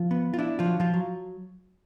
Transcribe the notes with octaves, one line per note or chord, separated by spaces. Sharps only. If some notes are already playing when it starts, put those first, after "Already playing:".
Already playing: F3 F4
B3
F4
D4 E4
F3 F4
F#3
F3 F4
F#3